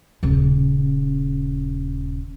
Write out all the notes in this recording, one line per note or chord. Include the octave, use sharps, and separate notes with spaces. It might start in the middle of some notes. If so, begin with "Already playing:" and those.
D#1 C#3